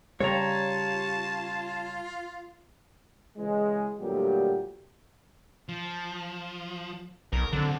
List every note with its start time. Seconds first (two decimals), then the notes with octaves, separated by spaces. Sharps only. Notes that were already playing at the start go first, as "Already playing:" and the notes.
0.20 C#3 G3 F4 C#5 A5 A#5
3.38 C#3 E3 G#3
4.00 D2 A#2 F#3 G3 G4
5.69 F3
7.33 B1 A#4
7.53 D3 F#3 C4